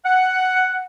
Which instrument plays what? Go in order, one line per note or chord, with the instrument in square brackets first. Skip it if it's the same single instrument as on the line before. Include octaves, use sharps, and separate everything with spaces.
[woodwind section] F#5